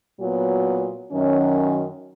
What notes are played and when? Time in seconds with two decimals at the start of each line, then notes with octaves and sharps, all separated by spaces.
0.18 A#2 F#3 B3
1.12 F#2 D#3 F#3 C#4